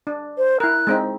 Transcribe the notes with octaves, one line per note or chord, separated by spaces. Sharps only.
D4
C5
E4 A#4 F#6
G#3 C4 D#4